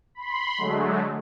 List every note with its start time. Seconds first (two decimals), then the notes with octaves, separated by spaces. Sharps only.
0.15 B5 C6
0.58 D3 F#3 G#3 A3